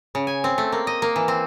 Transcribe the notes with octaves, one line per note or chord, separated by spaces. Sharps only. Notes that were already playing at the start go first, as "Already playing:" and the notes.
C#3
G#5
C4
A3
A#3
D#5
A#3
E3
C4